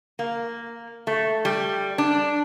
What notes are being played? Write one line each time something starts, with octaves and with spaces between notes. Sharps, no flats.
A#3
A3
G3
D4